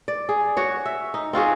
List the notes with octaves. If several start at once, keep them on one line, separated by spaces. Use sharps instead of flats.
D5
G#4
F#4 C#5
E5
D#4
C4 F4 F#4 G#4